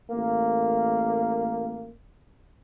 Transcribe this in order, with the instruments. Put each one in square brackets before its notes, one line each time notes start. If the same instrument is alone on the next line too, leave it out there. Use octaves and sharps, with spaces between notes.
[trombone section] A1 A#3